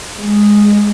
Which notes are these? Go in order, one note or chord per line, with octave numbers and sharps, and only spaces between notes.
G#3